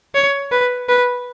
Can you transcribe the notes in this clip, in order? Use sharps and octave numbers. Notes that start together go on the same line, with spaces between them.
C#5
B4
B4